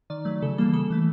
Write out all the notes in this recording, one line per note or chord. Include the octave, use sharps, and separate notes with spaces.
D#3 D5
F#3 A3
C#3 A4
E3 G3 A#3 A4
C#3 A4
E3 A3